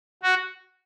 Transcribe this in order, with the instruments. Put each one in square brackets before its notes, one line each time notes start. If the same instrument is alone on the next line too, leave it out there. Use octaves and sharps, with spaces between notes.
[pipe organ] F#4